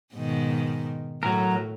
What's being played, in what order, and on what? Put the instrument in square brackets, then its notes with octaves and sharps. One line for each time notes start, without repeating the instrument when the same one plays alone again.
[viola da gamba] G#2 B2 D#3
[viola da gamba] A2 [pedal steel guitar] F#3 A#4